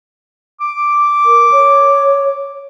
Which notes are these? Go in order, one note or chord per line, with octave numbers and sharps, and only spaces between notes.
D6
A#4
C#5